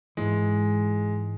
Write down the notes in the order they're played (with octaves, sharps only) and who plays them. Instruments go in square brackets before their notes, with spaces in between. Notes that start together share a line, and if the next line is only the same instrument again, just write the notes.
[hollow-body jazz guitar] G#2 E3 [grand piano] G#3